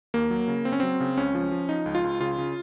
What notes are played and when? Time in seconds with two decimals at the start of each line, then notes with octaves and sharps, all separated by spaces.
0.14 D#2 A#3
0.31 F#3
0.48 C#3
0.65 C#3 C4
0.72 C#4
0.80 F#3 C4
1.00 C#3
1.17 C#2 C#4
1.35 F3
1.51 F3
1.69 F3 D#4
1.86 C#2
1.95 F4
2.04 C#2
2.21 C#3 F4
2.38 C#3